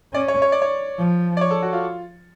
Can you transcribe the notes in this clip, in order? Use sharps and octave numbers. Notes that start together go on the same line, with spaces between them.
C#4 D5
C#5
C#5
D5
C#5
F3
D5
C#5
A4
F#4
F4